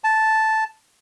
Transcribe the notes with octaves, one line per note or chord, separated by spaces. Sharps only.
A5